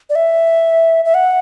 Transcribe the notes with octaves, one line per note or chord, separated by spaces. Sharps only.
D5
E5
E5
F#5